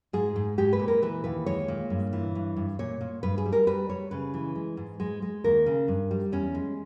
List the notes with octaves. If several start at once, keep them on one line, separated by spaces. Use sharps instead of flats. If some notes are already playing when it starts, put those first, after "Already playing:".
G#2 G#4
G#2
G#3 G4
B4
A#2
A#4
E3 B4
D#2 B4
G#3 C#5
A#2
G2
E3
G2
G2
A#2 C#5
A#2
G2 B4
G#4
G3
A#4
G3 B4
G3 C#5
C#3 B4
E3
G#3
G#2
G#3
G#3
D#2 A#4
C#3
G2
G3
E2 C#4
G#3